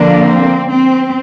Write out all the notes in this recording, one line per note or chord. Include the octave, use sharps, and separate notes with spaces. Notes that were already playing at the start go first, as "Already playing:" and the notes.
Already playing: D3 F3 A#3 D4
C4
C4